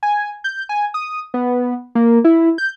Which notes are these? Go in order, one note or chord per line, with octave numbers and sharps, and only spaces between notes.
G#5
G6
G#5
D#6
B3
A#3
E4
G6